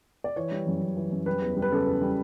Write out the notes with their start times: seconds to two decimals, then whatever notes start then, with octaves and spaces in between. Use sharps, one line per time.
0.24 D5
0.36 E3 C#5
0.52 G3
0.67 F#2
0.81 F#2
0.97 E3
1.11 F#2
1.26 G3 B4
1.42 E2
1.57 G3
1.62 B4
1.72 C#3 A4
1.87 E2
2.02 G3